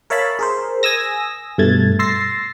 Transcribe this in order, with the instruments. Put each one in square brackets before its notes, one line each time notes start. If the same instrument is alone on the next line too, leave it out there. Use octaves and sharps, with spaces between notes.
[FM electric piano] A#4 C#5 E5 F5 A5 B5
G#4 A#4 C5
G#5 D#6 E6 A#6
G2 B2 A3 G#6 A6
C6 E6 A6 A#6 C7